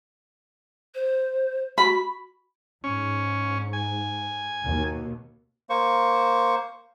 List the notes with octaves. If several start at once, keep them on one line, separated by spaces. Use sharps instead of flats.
C5
F#4 B5
G#2 C#4
G#5
D#2 B2
A#3 C5 C#6